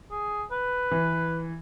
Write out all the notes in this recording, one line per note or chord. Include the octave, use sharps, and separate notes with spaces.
G#4
B4
E3